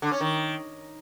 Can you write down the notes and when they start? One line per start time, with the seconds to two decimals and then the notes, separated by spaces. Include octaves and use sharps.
0.02 D3
0.11 C#4
0.21 D#3